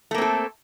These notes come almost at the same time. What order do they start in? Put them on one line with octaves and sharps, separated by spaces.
A3 A#3 C4 A4